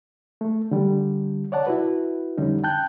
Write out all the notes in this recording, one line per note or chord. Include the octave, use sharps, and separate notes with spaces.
A3
D3 G3
C#5 D5 F#5 A5
E4 F#4 B4
F2 D3 G3 C#4 D#4
G5 A5 F#6 G6